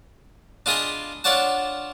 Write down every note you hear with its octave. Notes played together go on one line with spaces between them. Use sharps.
D4 F4 G#4 D#5 B5 C6
D4 F4 C#5 D5 F#5 A5